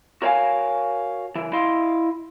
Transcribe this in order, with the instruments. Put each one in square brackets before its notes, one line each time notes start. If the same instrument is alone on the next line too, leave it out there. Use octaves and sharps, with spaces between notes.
[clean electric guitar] F#4 A#4 C#5 E5 F5 G#5
C#3 E3
E4 D#5 F5 C6